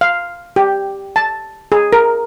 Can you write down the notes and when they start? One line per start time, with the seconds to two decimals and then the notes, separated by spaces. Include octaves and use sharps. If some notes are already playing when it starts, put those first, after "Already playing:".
0.01 F5
0.56 G4
1.16 A5
1.72 G#4
1.93 A#4